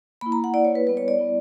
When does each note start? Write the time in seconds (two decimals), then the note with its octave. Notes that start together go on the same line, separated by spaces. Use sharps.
0.21 A#3 E4 B5
0.32 A#5
0.44 F#5
0.54 A#3 E4 D5
0.65 C#5
0.75 B4
0.87 G3 B3 E4 B4
0.97 C#5
1.08 D5
1.19 G3 B3 E4